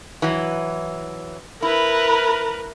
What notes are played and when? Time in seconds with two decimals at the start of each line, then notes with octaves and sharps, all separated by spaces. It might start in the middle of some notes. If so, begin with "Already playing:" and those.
0.22 E3 F#3
1.62 E4 A#4 B4